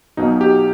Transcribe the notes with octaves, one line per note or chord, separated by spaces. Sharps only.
B1 B2 D#4
G4